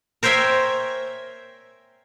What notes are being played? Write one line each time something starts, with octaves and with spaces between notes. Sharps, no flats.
A#4 C5 C#5 E5 G5 G#5